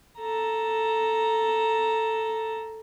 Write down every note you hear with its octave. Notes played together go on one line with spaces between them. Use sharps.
A4 A#5